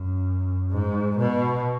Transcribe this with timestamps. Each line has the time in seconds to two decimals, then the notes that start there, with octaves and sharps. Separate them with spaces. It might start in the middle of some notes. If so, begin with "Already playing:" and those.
Already playing: F#2
0.70 G#2
1.17 B2